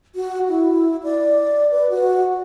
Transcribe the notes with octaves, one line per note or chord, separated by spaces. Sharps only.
F#4
E4
D5
B4
F#4